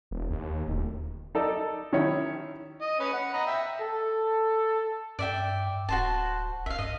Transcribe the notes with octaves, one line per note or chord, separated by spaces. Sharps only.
E1
D#2
D1
D#4 A4 D5
D#3 C#4 E4 C#5
D#5
C#4 B4
F#5
D#5 A#5 B5
E5 G5
A4
G2 D5 E5 G5
D1 F#4 C5 A5
A#1 E5 F5
G2 D#5